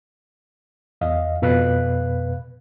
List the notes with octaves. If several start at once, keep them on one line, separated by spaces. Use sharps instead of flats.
E2 D#5 F5
F2 B2 B4 F5 B5 F#6